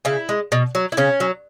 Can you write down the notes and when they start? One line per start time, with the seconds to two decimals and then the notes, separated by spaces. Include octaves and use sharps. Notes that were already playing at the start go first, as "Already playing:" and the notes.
0.05 C#3 E4
0.29 G#3
0.52 B2
0.75 F#3
0.92 E4
0.97 C#3 C#4
1.20 F#3